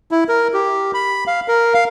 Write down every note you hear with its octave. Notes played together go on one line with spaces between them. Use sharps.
E4
A#4
G4
B5
F5
A#4
F5